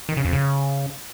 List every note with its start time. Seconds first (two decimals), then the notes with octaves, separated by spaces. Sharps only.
0.09 D#3
0.17 C#3
0.25 F2
0.33 C#3